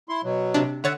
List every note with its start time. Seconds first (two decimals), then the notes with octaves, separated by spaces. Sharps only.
0.09 E4 C6
0.24 B2 F#3
0.54 C3 D4
0.84 D3 C#5 E5 F#5 A6